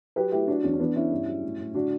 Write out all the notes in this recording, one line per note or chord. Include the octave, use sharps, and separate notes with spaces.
F#3 G4 B4
A3 E4 G4
F#3 D4 F#4
E2 C#4
C#4
E3 B3 D4
C#3 C#4 E4
G2
F#3
A2
A2
D3 D4 F#4